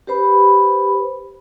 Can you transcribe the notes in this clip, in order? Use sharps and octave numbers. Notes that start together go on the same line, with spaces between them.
G4 B4 C5 B5